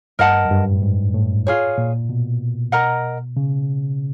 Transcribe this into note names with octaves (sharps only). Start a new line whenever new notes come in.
G2 A#4 D#5 F#5 A5
F#2
G2
A2
G#2
A2
F4 G#4 C#5
A#2
B2
A#4 D#5 F#5 A#5
C#3